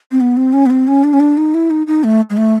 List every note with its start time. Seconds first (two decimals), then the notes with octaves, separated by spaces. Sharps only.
0.11 C4
0.21 B3
0.37 C4
0.53 C#4
0.66 B3
0.70 C4
0.88 C#4
1.04 D4
1.13 C#4
1.20 D4
1.37 D#4
1.54 E4
1.70 D#4
1.87 D#4
2.04 A3
2.30 G#3
2.37 A3